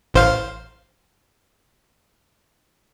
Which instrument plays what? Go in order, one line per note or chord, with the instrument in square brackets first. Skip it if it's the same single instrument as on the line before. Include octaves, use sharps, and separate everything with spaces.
[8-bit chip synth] A1 C5 F5